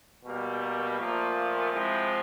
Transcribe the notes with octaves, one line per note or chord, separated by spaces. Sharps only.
B2 G3 A#3
A#3
A#2 F3 A3 A#3
A#3
C3 F3 G#3 E4